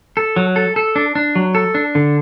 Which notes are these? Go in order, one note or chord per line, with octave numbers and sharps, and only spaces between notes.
A4
F#3
A4
A4
D4
D4
F#3
A4
D4
D3